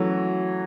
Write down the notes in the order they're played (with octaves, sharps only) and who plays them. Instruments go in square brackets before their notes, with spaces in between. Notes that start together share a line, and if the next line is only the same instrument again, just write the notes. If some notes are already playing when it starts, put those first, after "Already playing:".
Already playing: [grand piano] E3 F#3 [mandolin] A3 C#4 F#4